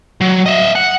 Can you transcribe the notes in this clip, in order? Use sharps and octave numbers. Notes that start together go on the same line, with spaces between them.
F#3
D#5 E5
F#5